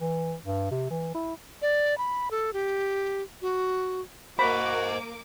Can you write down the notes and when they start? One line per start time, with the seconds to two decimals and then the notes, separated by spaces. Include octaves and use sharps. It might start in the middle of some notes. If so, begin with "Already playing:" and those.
0.01 E3
0.45 G2
0.71 C3
0.91 E3
1.15 E4
1.62 D5
1.98 B5
2.31 A4
2.53 G4
3.42 F#4
4.39 A#3 F#4 C5 D#5 B5 D6